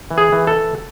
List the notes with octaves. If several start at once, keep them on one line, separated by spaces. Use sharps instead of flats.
E3
G#4
E3
A4
E3